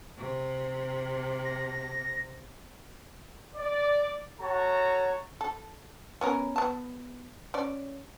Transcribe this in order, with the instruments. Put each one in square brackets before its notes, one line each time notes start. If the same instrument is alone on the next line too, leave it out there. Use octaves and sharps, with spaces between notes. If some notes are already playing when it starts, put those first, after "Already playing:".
[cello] C3
[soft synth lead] A#6
[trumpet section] D5
F#4 A4 C#5 A5 A#5
[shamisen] A4
B3 C#4 A#4
B3 A5
C#4 D5